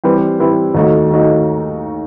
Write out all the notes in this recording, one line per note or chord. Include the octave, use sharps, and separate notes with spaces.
E3 G3 C4 E4 B4
E3 G3 C4 E4 B4
D#2 D#3 A3 D#4 F#4
D#3 A3 D#4 F#4